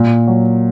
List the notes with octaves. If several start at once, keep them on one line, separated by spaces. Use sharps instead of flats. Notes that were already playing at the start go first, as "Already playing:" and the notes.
Already playing: A#2
F#3